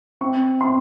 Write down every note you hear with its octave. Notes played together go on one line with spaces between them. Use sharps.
C4 C#6
C4 C6